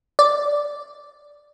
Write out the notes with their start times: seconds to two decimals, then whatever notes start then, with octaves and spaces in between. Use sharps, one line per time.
0.19 D5